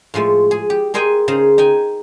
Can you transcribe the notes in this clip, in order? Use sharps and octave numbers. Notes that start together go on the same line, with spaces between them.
A2 F3 G#3 A3
G#4
G4
G#4 A#4 C5 D#5 G5 G#5
C#3 D#4 G#4 C5 A#5
D#4 G5 G#5